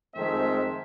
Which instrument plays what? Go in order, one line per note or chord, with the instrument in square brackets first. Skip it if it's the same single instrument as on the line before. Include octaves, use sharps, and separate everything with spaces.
[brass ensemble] F2 D#3 G#3 A3 C4 E5